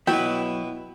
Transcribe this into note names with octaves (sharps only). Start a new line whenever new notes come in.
B2 F#3 B3 E4 F#4 G5